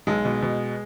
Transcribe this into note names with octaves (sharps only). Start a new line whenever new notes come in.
B1 G#3
B2
B2